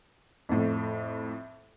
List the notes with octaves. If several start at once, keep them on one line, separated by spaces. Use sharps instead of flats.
F2 A2